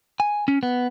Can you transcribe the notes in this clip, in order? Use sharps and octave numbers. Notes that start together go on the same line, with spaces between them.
G#5
C#4
B3